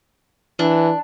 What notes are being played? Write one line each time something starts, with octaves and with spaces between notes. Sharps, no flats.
E3 D4